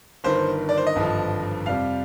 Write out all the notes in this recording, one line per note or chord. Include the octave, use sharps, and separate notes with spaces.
G1 G2 D#3 C5
D5
C5
D#5
G#1 G2 D3 F3
F2 C3 G3 F5